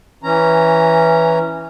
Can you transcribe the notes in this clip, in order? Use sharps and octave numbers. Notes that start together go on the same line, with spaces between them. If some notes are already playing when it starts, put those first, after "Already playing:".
E3 C#4 A#5